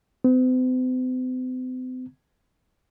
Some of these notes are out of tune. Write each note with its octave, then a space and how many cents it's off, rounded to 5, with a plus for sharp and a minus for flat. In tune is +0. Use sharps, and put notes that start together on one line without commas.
C4 -45